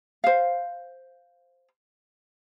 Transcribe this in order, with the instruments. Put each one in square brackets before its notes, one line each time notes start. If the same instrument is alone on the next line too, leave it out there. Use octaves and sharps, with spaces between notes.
[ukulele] C5 F5